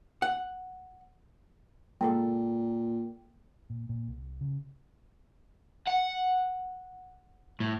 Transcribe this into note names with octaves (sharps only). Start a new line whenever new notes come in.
F#5
A#2 G#3 A#3 A4 G5
A#2
A#2
C2
C#3
F#5
A2